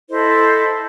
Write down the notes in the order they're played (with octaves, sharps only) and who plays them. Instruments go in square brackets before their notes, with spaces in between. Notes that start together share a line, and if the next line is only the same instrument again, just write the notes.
[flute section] E4 A4 C5 D#5